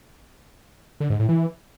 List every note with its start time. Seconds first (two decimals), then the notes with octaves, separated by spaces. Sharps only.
1.00 D3
1.10 G#2
1.19 A2
1.29 E3